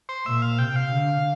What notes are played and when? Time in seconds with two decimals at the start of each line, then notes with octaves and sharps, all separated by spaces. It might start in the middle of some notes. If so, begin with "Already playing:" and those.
0.09 C5
0.26 A#2 E5
0.42 F5
0.59 C3 G5
0.76 F5
0.93 D3